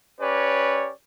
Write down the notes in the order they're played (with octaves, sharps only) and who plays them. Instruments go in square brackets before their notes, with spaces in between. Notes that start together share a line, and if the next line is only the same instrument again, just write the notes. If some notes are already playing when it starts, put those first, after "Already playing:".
[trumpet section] C#4 G4 B4 C#5 D5